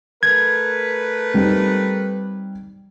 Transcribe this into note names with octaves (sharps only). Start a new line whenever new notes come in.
A3 A#4 B4 G#6
G3 C4 D#4